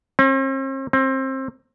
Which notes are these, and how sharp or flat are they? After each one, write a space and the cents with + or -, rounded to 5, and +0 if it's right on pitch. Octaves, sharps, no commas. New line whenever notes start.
C4 +45
C4 +25